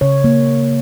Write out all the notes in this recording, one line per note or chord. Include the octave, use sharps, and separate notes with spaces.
C#3 C#5
A#3